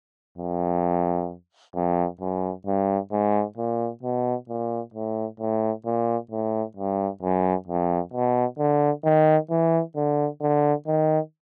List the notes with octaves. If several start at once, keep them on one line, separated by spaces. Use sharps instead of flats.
F2
F2
F#2
G2
G#2
A#2
B2
A#2
A2
A2
A#2
A2
G2
F#2
F2
B2
D3
D#3
E3
D3
D3
D#3